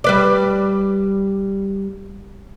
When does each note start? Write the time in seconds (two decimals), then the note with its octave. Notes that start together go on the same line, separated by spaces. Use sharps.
0.04 G3 B4 D5